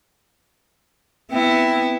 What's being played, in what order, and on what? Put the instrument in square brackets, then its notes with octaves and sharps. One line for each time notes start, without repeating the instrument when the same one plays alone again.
[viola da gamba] B3 E4 [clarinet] C4